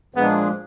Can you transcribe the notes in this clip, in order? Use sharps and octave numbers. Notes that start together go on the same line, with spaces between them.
A#2 F3 G#3 B3 D4 G#4